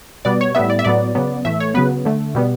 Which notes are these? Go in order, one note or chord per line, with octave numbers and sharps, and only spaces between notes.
B2 G3 B3 D5
C#5
A2 G3 B3 E5
D5
E5
A2 F#3 B3 D5
C#3 F#3 B3
A2 E3 A3 E5
C#5
C#3 F#3 B3 B4
D3 A3
B2 G3 B3